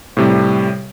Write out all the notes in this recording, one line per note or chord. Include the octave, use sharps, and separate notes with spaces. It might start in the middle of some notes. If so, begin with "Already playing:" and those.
A2 C3 G3